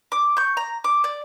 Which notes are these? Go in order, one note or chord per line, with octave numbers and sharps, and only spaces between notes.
D6
C#6 G6
A#5
D6
D5